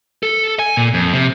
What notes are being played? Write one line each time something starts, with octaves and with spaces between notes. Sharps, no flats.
A4
G#5
A#2
F2
C3